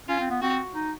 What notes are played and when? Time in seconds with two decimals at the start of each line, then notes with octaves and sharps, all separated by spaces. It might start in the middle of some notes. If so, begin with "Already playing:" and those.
0.08 C#4 F4
0.20 C4
0.30 B3
0.42 C4 F#4
0.75 D#4